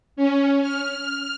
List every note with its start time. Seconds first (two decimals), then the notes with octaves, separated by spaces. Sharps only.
0.17 C#4
0.62 F6